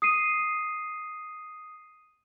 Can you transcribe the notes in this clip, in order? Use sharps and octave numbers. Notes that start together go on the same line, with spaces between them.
D#6 C7 D#7